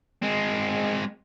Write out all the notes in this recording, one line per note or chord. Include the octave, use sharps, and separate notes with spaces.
G#3 C4